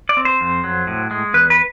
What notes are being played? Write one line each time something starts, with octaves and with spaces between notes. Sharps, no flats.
D5
C4
C5
F2
F#3
A2
G#3
E2 B4
B4